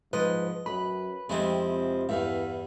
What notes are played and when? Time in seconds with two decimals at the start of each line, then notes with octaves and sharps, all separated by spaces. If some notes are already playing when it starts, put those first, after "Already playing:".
0.13 G#2 F3 B4 D#5
0.66 F#2 B4 B5
1.29 F2 C3 F3 G#3 C4 E4
2.09 E2 G2 E3 E5 F5